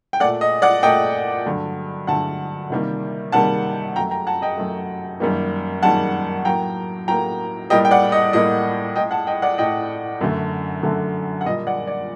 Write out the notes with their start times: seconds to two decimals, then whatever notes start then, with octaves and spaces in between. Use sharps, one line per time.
0.13 G5
0.20 A3 D5 F#5
0.24 A#2
0.41 D#5
0.62 D5 F#5
0.83 A#2 A3 D#5 G5
1.45 G2 D3 F#3 A3
2.07 G2 D3 F#3 A3 F#5 A5
2.70 C3 D#3 G3 A#3
3.32 C3 D#3 G3 A#3 F#5 A5
3.96 F#2 F#3 A3 G5 A#5
4.11 G5 A#5
4.27 F#5 A5
4.42 D#5 G5
4.57 F#2 F#3 A3
5.20 F#2 D#3 G3 A#3
5.83 F#2 D#3 G3 A#3 F#5 A5
6.45 A2 F#3 A#3 G5 A#5
7.08 A2 F#3 A#3 G5 A#5
7.70 A2 G3 A#3 D#5 G5
7.85 G5
7.91 D5 F#5
8.12 D#5
8.33 A2 G3 A#3 D#5
8.95 A2 A3 D#5 G5
9.11 F#5 A5
9.27 D#5 G5
9.42 D5 F#5
9.58 A2 A3 D#5 G5
10.21 F#2 D3 A3
10.83 F#2 D3 A3
11.41 F#5
11.45 A#2 G3 A#3 D#5
11.67 D5 F#5
11.87 D5